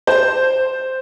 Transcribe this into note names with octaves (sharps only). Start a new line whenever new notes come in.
C5